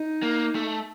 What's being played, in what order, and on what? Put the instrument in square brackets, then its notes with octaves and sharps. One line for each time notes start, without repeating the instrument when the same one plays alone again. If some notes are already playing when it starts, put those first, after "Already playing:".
Already playing: [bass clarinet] D#4
[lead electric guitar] A#3
A3